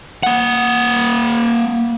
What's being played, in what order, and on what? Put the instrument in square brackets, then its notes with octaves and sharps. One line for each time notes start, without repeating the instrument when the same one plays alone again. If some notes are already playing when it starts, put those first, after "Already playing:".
[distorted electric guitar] A#3 F#5